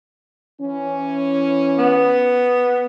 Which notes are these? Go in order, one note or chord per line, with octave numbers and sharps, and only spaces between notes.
E3 C#4
B3